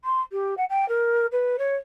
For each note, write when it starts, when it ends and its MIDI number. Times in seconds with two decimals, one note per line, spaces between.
0.04 0.21 84
0.32 0.54 67
0.57 0.64 78
0.69 0.87 79
0.88 1.26 70
1.32 1.56 71
1.58 1.76 73